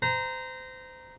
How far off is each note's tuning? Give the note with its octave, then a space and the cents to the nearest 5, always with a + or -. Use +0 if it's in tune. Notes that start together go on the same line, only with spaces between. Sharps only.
C5 -30 A#5 +0